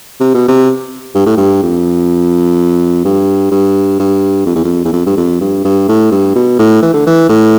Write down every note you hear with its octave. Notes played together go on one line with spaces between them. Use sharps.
C3
B2
C3
G2
A2
G2
F2
G2
G2
G2
F2
E2
F2
E2
F2
G2
F2
G2
G2
A2
G2
B2
A2
E3
D3
E3
A2